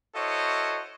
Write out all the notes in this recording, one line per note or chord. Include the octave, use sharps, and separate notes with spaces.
E4 F#4 A4 C5 C#5 D#5